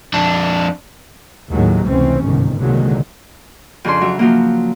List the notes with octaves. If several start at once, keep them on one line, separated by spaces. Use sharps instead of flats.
F2 D4
D#2 A2 D#3 F#3 G#3
F1 C#2 E3 C4 C#4
G1 C2 G#2 D#3
C2 A#2 D3 D#3 F#3 G#3
F2 C#3 D4 G#4 C6
F#3 E5
F3 F#3 A#3